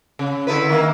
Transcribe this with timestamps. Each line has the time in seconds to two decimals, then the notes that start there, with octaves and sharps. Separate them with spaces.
0.19 C#3
0.47 D3 E4 B4
0.69 D#3 A#3